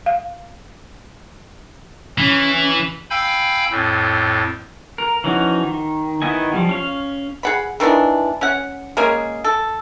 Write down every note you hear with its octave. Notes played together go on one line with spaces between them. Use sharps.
F5
E3 C#4
F5 G5 G#5 B5 E6 G6
F2 A2
A#4
E3 F3 C#4 D#4 F#4
D#3
D#3 B3 E4 D#5 G#5
F3 G3
C#4 F5
G#4 F#5 B5
D#3 E3 B3 D4
C#4 F#5
G#3 A#3 C#4 G#4
A4